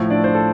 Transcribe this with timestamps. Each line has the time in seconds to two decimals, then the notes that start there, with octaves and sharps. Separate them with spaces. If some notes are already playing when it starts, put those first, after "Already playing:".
Already playing: A2 F3 A3
0.10 D4 D5
0.24 C5
0.35 A4